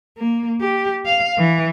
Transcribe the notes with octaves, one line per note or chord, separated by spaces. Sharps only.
A#3
G4
F5
E3